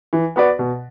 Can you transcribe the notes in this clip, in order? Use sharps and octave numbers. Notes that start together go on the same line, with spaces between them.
E3
B3 F#4 B4 D5
B2